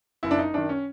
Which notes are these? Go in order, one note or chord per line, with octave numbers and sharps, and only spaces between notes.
F#1 E4
D4
D#4
F#2 D#3 D4
C#4